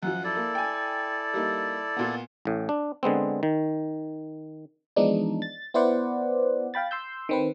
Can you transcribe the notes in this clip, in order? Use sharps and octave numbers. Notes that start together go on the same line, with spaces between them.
F#2 F3 F#5
E4 A4 D5
A#3
G5 G#5
G3 A#3 D#4
A#2 B3
A1 A2
D4
D3 G#3 B3 C4
D#3
E3 F3 G#3 B3 D4 D#4
A6
B3 E4 B4 C5 D5 F#5
F5 G5 B5 A6
C6 E6 G6
D#3 C4 B4